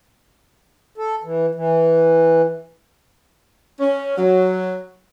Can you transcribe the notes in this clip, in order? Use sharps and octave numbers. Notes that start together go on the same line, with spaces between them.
A4
E3
E3
C#4
F#3